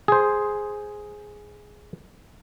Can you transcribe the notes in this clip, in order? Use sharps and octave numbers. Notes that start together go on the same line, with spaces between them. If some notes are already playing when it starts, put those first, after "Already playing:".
G#4 C5